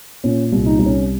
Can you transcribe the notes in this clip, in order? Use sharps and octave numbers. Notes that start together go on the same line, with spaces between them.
A#2 C#4
C2
D#4
C2 D#4
C#4